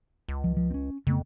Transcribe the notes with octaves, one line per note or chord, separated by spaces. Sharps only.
C#2
F3
F3
C4 C#4
F2 C#3 A3 B3